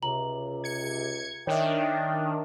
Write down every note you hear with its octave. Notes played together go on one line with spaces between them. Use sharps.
C#2 C3 A#5 F#7
G#6 C#7
D#3 D4 C#5 E5 G5